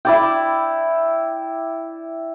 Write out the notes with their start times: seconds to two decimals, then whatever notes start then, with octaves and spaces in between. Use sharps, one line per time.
0.05 E4 D5 G5